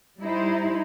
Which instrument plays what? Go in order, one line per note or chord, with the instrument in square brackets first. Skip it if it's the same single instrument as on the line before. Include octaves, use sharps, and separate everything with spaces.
[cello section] G3 D#4 E4 C5